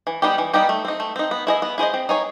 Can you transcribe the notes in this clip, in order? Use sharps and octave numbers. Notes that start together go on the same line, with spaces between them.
E3
G3 B3 D#4 G4
E3
G3 B3 D#4 G4
A3
C4 D#4
A3
C4 D#4
B3
E4 G#4 C5 D#5
B3
E4 G#4 C5 D#5
C4
D#4 G#4 C#5